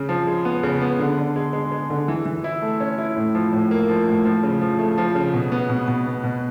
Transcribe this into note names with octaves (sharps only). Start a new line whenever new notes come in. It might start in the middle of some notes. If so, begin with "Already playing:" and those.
Already playing: C#3
F3
G#3
B3
C#3
B3
D3
D3
G#3
G#3
G#3
D3
E3
E3
E4
A3
C#4
E4
A2
F3
A2
A#3
F3
A2
F3
C#3
F3
A3
F3
C#3
B2
B3
B2
B2
B3
B2